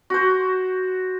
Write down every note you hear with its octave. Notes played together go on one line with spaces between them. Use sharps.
F#4 C5